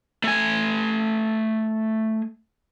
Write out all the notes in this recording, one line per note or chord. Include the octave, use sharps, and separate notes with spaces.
A3 G#5